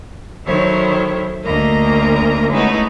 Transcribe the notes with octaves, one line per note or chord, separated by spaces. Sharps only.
D#3 F#3 E4 A4 C5 C#5
D2 A#3 A#4 D#5 A#5
G#3 A3 B3 C#4 D#4 E4